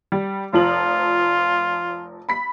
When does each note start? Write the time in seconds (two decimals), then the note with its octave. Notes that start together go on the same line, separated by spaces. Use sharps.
0.12 G3
0.53 F1 F3 F4 F#7
2.29 B5 B6